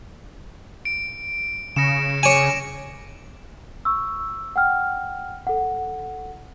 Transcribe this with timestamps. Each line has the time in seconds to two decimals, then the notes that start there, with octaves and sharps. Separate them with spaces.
0.85 D7
1.76 C#3 A#6 C#7 E7
2.23 C#5 G#5 D6 D7 E7
3.85 C#6 E6
4.56 F#5 G5 F6
5.47 A4 F#5